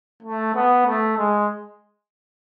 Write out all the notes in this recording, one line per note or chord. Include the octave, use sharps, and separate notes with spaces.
A3
B3
A3
G#3